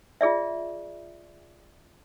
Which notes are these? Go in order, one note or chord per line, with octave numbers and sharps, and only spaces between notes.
F4 G#4 D5 E5